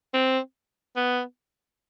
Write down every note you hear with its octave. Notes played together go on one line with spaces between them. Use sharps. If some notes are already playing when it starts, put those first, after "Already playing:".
C4
B3